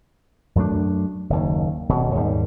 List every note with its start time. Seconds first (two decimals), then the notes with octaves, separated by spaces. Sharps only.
0.55 F#2 F#3 A3 D4
1.30 F#1 D#2
1.89 D#1 B2
2.15 D#2 G#2 G3